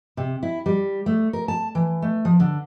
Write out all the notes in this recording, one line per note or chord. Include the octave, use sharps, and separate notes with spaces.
C3
E4
G3
A3
A#4
A5
E3
A3
F3
D3